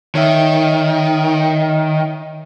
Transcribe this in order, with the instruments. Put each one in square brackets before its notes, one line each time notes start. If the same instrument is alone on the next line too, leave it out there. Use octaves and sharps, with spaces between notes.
[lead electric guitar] D#3 [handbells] C#5 E5